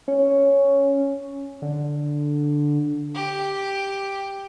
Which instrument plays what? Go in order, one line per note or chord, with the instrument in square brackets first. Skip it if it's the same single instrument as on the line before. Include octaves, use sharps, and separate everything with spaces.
[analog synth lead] C#4
D3
[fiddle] G4